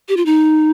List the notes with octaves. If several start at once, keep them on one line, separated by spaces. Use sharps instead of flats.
G4
F4
D#4